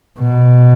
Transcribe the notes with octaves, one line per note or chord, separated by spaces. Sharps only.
B2